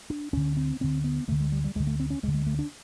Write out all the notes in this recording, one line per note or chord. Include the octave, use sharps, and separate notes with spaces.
D4
D2 D3 C#4
C4
D2 D3 C4
B3
D2 D3 A3
G#3
G3
G3
D2 D3 G#3
A3
C4
C#4
D2 D3 G#3
G#3
A3
D4